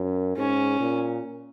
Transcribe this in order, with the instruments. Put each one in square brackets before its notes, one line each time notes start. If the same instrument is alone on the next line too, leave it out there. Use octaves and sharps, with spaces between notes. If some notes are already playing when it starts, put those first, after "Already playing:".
Already playing: [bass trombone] F#2
[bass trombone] G#2 [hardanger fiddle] C#4
[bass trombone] A#2